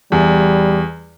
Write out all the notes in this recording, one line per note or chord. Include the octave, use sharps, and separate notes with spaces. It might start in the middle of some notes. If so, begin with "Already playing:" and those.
E2 G3